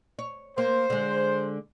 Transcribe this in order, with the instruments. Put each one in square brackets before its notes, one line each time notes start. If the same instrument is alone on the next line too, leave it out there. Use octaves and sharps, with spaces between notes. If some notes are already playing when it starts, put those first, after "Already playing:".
[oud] C#5
[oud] A#3 [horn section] C5
[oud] D3 G#3